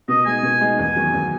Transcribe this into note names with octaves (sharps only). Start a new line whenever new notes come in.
B2 D#5
G#3 D#4 G#5
B2
G#3 D#4
E2 G#5
D#3 F#3
E2